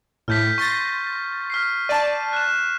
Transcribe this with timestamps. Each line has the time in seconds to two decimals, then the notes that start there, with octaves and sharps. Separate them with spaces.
0.28 A2 F6 G6 B6
0.58 C6 C#6 A6 A#6
1.50 F6 B6 C7
1.89 D5 A5 D#7
2.33 F#6 E7